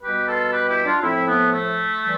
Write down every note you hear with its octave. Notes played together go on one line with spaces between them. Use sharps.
B2 G3 G4 B4
F4 A4
G4 B4
E4 G4
D4 F4
A2 F3 C4 E4
B3
A3
E3 G3